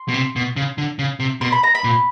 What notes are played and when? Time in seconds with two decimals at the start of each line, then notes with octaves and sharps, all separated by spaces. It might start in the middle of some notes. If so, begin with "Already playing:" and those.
Already playing: C6
0.08 B2
0.14 C3
0.36 B2
0.56 C#3
0.78 D3
0.99 C#3
1.20 C3
1.41 B2 C6
1.52 B5
1.63 A#5
1.75 B5
1.84 A#2